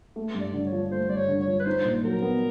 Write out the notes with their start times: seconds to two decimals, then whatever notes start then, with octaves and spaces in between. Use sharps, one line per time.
0.16 A3
0.35 G2
0.41 D5
0.54 D3
0.66 C#5
0.72 F3
0.92 A3 C5
1.09 G2 D5
1.17 C#5
1.28 D3
1.42 C#5
1.48 F3
1.60 B4
1.66 D#4 C5
1.85 A#2
2.04 F#3 A#4
2.22 B3